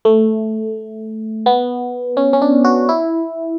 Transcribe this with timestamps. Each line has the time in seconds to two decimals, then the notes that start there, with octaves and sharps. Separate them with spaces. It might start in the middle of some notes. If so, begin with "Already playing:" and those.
0.05 A3
1.46 B3
2.17 C#4
2.33 C#4
2.42 D4
2.64 F#4
2.89 E4